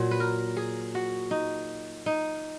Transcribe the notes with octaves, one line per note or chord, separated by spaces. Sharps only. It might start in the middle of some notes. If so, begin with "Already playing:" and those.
Already playing: A#2 F#3
B4
A#4
G#4
F#4
D#4
D#4